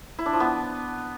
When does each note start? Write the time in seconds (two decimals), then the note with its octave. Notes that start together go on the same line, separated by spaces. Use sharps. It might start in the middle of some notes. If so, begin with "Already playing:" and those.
0.19 E4
0.26 D4
0.33 F3
0.40 B3